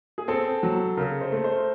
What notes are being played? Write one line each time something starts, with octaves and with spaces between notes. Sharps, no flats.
G#4
C4 A4
F#3
C#3 A#4
C5
A3
C5